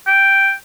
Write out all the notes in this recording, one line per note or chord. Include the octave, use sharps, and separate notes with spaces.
G5